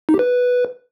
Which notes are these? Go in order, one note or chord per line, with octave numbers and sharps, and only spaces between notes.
D#4
G4
B4